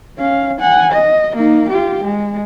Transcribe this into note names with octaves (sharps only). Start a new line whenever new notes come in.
C#4 F5
F#5 G#5
D#5
A#3 D#4
F4 G4
G#3